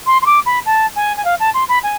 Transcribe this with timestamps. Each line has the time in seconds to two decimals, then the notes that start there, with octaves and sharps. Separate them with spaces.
0.06 C6
0.22 C6
0.26 D6
0.45 B5
0.65 A5
0.95 G#5
1.17 G#5
1.24 F5
1.39 A5
1.54 C6
1.68 B5
1.83 G#5